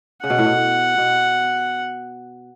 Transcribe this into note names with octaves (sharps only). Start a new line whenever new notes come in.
C#3 F#5
B2
A2
B2
B2